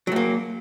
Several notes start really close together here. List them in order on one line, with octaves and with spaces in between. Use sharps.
F#3 A3 A#3